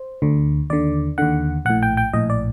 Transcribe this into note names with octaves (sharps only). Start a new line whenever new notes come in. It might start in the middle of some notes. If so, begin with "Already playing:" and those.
Already playing: C5
D2 D3
D#2 D3 D5
D#2 D3 F#5
A#1 A2 F#5
G5
G5
A#1 A2 D#5
D5